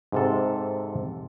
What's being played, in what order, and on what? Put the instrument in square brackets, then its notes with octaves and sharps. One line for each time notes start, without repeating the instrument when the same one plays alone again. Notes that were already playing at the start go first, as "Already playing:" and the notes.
[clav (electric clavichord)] G#2 C3 A4